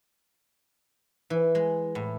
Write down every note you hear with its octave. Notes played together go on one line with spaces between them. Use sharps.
E3
G#3
A2